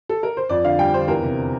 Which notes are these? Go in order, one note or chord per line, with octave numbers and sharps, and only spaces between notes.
A4
A#4
C5
F2 D5
D3 F5
G3 G5
D3 C5
E2 A#4
C3